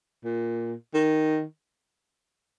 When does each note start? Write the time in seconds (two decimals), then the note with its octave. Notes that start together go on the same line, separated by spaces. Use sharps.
0.24 A#2
0.94 D#3